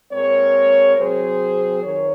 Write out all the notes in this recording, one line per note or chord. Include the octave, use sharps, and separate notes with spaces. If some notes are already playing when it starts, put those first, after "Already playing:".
A#2 G#3 C4 A#4 C#5
C3 F#3 C4 G#4 C5
F2 D#3 A#4 C#5